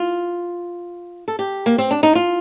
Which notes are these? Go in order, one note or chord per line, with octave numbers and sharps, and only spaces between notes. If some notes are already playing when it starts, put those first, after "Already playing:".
Already playing: F4
A4
G4
A#3
C4
D4
D#4
F4